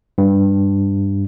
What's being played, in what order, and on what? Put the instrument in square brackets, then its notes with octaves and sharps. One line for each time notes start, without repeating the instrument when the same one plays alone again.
[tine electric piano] G2